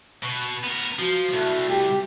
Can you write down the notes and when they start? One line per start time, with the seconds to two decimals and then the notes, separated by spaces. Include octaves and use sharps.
0.23 B2
0.64 B3 A#4
0.99 F3 F#4
1.33 C2 A3
1.70 G4